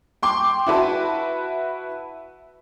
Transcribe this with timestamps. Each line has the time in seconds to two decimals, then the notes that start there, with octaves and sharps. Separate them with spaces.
0.23 G5 C6 D6
0.67 E4 F#4 B4 A5